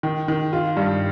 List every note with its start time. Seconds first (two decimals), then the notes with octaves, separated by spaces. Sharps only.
0.03 D#3
0.28 D#3
0.53 F4
0.77 G2